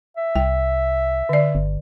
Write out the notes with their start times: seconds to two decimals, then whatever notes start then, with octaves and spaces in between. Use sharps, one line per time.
0.17 E5
0.36 C2 G5
1.29 D3 D5
1.55 G1